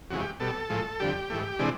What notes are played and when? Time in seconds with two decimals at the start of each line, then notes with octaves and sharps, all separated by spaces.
0.10 F2 C#3 E3 G#3 F#4
0.20 G4
0.40 B2 G3 A4
0.70 A2 F3 G#3
1.00 F2 D3 G3 G4
1.30 G#2 E3 A3
1.59 C3 E3 G#3 D4